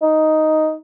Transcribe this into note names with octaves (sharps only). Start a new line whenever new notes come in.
D#4